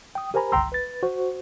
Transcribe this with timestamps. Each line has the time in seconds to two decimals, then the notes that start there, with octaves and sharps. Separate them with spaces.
0.15 G5 D#6
0.34 G4 A#4 C5 G#5 A#5 B5
0.52 G1 C#2 G5 A#5 C6 E6
0.72 B4 A6
1.03 F#4 C5